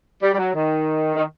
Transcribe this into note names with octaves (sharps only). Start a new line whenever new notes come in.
G3
G3
F#3
D#3
D#3